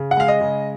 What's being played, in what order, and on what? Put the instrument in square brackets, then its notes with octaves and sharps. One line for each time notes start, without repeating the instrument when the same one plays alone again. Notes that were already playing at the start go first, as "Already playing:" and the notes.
Already playing: [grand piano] C#3
F#5
G#3 F5
D#5
C#3